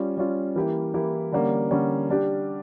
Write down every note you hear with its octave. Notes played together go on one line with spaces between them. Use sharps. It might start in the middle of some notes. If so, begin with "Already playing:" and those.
Already playing: G3 C#4 F4
G3 C#4 F4
E3 A#3 E4 G4
E3 A#3 E4 G4
D3 G3 A#3 C#4
D3 G3 A#3 C#4
G3 D4 G4